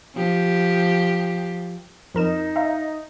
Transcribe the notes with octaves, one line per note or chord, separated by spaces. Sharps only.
F3 G4
F2 D#4 A#4 E7
E5 F5 A#5